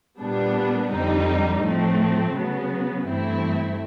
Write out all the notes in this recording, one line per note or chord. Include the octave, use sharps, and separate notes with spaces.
A#2 G3 B3 D4
F2 D3 G3 C4 D#4
A2 F3 A3 C4
C#3 F#3 B3
G2 E3 A3 C4 E4